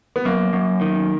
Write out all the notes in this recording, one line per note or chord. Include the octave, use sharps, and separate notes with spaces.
B3
F#2 A#3
F#2
D#3